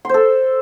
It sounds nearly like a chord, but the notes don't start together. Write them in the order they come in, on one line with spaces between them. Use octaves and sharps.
C6 C5 A4